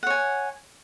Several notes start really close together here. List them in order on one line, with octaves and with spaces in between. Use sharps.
F#5 C#5 G#5